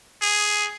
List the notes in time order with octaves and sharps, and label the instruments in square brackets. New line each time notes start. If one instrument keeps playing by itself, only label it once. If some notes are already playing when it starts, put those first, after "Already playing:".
[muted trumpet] G#4